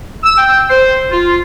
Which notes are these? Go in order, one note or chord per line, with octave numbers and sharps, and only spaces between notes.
E6
G5
C5
F4